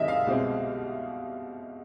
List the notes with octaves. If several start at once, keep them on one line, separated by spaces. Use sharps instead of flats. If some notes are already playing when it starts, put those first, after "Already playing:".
Already playing: F#2 D#3 G#3 C4 D#5 E5
F5
C2 B2 G#3 C4